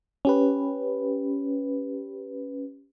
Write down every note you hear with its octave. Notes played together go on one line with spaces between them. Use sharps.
C#4 G4 B4